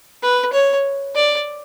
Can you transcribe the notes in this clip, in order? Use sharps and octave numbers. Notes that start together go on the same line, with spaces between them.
B4
C#5
D5